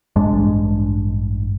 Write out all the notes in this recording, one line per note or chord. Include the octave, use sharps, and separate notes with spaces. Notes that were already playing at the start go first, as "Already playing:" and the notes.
A1 G2 G#3 D4